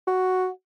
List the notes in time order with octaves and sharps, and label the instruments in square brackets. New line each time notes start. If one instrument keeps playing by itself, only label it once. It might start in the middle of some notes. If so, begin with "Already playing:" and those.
[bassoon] F#4